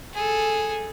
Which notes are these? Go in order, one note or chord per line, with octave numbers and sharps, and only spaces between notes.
G#4 A4